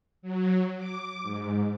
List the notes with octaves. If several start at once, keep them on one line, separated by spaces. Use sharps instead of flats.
F#3
D6
G#2